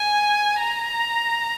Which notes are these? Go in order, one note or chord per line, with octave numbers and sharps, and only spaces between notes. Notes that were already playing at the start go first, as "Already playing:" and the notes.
Already playing: G#5
A#5